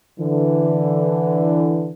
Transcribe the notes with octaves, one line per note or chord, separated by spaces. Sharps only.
D3 E3